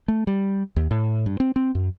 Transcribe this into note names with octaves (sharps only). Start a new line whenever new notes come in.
A3
G3
D#2
A2
G2
C4
C4
F#2